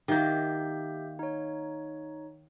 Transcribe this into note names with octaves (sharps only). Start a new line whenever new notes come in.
D#3 A#3 G4 E5 G6
D#4 C#5